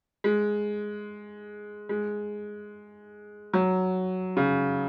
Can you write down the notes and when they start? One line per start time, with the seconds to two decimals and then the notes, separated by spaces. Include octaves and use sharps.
0.24 G#3
1.89 G#3
3.54 F#3
4.37 C#3